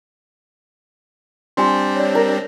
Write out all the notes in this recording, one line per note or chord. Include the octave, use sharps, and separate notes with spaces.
G3 C4 D4 F4 G#5 C6
C#5 D5
A#4